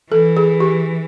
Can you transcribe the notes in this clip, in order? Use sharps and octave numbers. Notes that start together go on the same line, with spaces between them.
E3 A4
G#4
G4